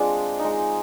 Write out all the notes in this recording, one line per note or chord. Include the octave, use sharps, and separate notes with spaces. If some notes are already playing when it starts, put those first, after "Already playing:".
Already playing: G#3 C4 D4 F4
G#3 D#4